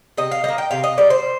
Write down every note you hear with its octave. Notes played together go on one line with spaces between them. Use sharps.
C3 D#5
F5
G3 A#3 D#5
G5
C3 F5
D#5
G3 A#3 D5
C5